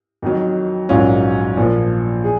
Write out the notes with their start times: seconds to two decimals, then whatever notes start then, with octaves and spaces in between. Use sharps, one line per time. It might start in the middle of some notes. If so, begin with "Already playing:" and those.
0.22 F2 D#3 F#3
0.89 A#1 G#2 F#3 C#4 F4
1.57 A#1 A#2 F3
2.24 G#4